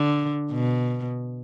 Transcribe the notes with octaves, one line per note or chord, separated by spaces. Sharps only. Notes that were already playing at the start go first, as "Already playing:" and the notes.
Already playing: D3
B2